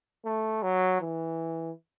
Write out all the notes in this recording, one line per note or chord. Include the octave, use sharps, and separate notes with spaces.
A3
F#3
E3